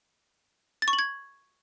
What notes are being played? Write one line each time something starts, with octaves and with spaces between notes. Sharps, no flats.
A6
C#6
F#7
G#6